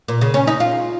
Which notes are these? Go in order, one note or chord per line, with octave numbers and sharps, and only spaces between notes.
A#2
C#3
C#4
D#4
F4